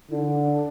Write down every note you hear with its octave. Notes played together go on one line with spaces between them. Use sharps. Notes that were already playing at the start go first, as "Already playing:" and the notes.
D3 D4 E4